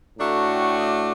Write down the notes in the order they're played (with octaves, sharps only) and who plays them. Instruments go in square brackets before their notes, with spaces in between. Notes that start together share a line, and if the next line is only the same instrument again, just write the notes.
[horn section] A2 A3 D4 F#4 A4 [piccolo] A#5
[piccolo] A#5
G5
F#5
G5
D#6
D6